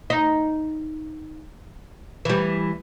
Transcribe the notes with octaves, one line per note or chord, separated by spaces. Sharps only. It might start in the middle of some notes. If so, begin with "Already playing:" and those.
D#4
E3 G3